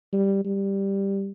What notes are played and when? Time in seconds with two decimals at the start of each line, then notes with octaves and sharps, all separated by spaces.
0.13 G3
0.45 G3